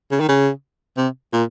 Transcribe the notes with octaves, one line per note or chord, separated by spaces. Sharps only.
C#3
D#3
C#3
C3
A#2